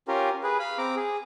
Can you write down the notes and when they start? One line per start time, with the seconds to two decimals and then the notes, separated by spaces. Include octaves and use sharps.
0.08 C#4 F4 G4 A#4
0.43 G#4 B4
0.59 F5 B5
0.78 C4 A#5 D6
0.96 G#4